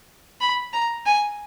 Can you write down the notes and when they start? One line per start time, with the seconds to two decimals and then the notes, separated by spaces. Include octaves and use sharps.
0.41 B5
0.73 A#5
1.06 G#5